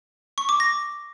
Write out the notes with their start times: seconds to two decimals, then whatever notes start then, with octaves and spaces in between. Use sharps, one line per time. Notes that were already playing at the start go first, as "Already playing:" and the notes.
0.38 C#6
0.49 D6
0.60 A#6